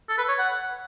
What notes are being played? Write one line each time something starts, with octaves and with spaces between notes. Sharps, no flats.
A4
B4
C#5
F#5